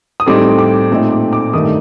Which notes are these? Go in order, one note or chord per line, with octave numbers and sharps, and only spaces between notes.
D#6
A2 G3 C4 D#4 D6
D6
A#2 A3 C4 D#4
D6
D6
G2 D#3 A3 D#4 D#6